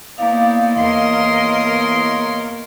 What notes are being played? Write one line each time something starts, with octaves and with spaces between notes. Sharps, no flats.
A#3 B3 D#4 E4 C5 D5 F5
E2 E3 A#4 C#5 D#5 C6